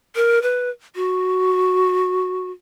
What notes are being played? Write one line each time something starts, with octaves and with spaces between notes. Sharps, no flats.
A#4
B4
F#4